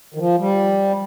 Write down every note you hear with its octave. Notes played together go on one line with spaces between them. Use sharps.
D#3
F3
G3